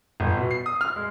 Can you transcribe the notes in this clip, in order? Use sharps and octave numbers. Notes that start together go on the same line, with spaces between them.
G1
B2
C7
D#6
F6
G#3